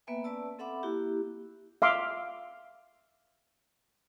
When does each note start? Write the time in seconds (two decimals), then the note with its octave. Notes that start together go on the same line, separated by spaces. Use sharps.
0.07 A#3 B3 B4 E5 G5 G#5
0.24 C#4 B4 D5 A5 E6
0.59 C4 A4 E5 F#5 B5 D6
0.83 A#3 E4 F#4 G4
1.82 E5 F5 C6 D6